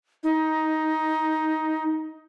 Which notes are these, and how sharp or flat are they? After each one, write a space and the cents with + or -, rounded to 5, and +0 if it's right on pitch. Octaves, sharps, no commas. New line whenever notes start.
D#4 +10